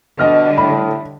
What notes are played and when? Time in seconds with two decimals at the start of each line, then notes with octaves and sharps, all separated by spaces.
0.19 B2 D3 G3 D#5 F6
0.58 A2 B5